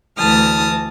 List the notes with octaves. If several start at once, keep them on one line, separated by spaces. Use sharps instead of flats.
D2 E3 A5 D#6 F6